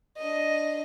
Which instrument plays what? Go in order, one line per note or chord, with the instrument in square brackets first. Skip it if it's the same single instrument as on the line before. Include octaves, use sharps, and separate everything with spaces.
[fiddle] D4 D#5